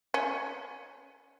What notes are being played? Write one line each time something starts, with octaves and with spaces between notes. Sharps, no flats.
C#4